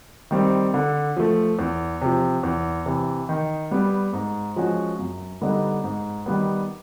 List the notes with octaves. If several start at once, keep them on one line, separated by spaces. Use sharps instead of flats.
D#3 G3 C4
D3
F3 A3
E2
C3 F3
E2
C3 E3
D#3
G3 B3
G#2
F3 G#3 C#4 F#4
F#2
D3 G3 B3 D#4
G#2
D#3 G3 B3